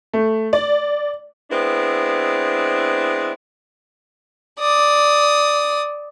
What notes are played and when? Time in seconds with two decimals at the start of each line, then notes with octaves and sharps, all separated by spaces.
0.13 A3
0.53 D5
1.50 G#3 B3 C4 D4 E4
4.59 D5 D#6